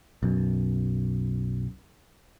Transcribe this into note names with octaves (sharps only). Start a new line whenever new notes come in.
B1 F#2